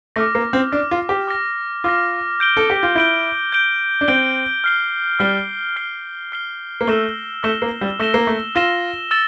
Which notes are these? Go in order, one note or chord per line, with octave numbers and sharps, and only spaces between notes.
A3 D6 F6 A#6
A#3
C4
D4 D6 F6 A#6
F4
G4
D6 F6 A#6
F4 D6 F6 A#6
G6 D7 G7
A4
G4
F4
E4 G6 D7 G7
G6 D7 G7
D4
C4 G6 D7 G7
F6 C7 G7
G3 F6 C7 G7
F6 C7 G7
F6 C7 G7
A#3
A3 E6 A#6 E7 G7
A3 E6 A#6 E7 G7
A#3
G3
A3 E6 A#6 E7 G7
A#3
A3
F4 E6 A#6 E7 G7
E6 A6 E7 G7